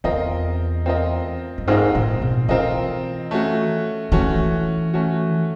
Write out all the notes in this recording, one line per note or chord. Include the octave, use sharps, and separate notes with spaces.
E2 C4 F4 A#4 D#5
C4 F4 A#4 D#5
G2
G#2 C4 F4 A#4 D#5
A2
B2
E3 C4 F4 A#4 D#5
A3 C#4 F#4
E3 A3 C#4 F#4
A3 C#4 F#4